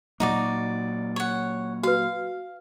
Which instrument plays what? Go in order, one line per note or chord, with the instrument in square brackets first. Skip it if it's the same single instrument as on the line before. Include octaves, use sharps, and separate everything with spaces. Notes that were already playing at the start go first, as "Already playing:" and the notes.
[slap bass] A#2 F#3 A#3 [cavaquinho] D#4 F#4 D5
[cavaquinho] C#5 F#5
[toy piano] F#4 B4 [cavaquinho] F5